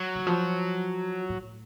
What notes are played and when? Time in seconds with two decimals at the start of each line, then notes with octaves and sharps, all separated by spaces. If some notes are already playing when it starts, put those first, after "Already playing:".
Already playing: F#3
0.15 D#3
0.27 F3
1.29 A2